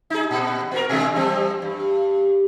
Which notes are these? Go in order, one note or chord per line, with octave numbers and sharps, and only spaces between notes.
D#4 G#4
A#2
B3 F#4 A#4
B2 D3 G#3
E2 G3 C4
G2